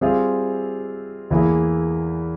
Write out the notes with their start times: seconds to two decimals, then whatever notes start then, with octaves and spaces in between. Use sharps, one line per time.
0.01 G3 C4 F4 G#4 E5
1.30 E2 E3 A#3 E4 G#4